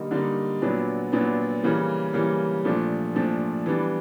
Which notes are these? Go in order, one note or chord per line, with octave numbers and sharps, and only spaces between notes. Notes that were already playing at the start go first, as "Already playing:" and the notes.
Already playing: D3 G3 A#3 D#4
D3 G3 A#3 D#4
A#2 F#3 B3 D4
A#2 F#3 B3 D4
C#3 E3 G3 A#3
C#3 E3 G3 A#3
A#2 F3 A3 D4
A#2 F3 A3 D4
E3 G3 B3 D4